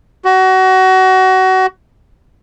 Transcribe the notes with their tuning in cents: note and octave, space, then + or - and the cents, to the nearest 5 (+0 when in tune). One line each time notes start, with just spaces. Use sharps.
F#4 +25